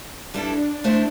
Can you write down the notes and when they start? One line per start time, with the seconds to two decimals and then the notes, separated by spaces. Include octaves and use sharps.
0.33 G2 G3 D4 E4 A4
0.84 D3 A3 E4 C5